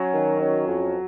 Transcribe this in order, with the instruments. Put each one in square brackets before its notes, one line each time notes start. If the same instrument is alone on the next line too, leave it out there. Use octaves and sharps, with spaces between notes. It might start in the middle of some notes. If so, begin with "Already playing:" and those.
Already playing: [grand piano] F#3 [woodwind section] C#4
[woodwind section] D#3
C#4
F2